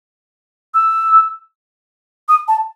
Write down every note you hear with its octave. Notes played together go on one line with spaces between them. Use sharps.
E6
D#6
A5